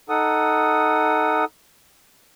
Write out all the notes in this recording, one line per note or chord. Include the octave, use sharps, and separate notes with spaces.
D#4 A4 F#5 D#6